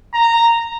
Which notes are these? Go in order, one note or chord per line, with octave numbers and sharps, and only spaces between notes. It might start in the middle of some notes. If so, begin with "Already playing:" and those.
A#5